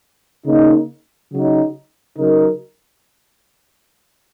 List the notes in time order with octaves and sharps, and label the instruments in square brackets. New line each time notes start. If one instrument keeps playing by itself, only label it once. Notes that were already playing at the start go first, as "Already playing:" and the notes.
[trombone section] C#3 A#3 D#4
C#3 F#3 D#4
C#3 F#3 D#4 A#4